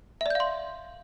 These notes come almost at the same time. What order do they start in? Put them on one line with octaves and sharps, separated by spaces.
E5 D5 G6 F5 C6